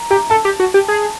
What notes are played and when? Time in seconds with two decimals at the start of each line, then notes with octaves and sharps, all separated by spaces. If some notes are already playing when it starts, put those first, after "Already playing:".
Already playing: A#5
0.10 G4 A#5
0.30 A4 A5
0.45 G4
0.60 F#4
0.74 G4
0.88 G#4